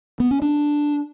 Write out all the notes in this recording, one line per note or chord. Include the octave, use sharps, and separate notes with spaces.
B3
C#4
D4